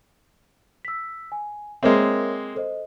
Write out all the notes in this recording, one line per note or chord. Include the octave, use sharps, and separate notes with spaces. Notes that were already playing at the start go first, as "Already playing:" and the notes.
E6 B6
G#5
G#3 A#3 C4 A#4 C#5 E5
A4 C5 D#5